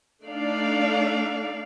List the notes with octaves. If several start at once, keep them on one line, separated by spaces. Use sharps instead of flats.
A3 D4 D#4 D5 F5